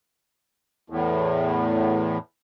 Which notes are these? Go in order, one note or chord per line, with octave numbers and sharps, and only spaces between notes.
E2 A2